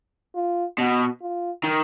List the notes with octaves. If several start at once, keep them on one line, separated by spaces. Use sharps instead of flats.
F4
B2 F#4
F4
D#3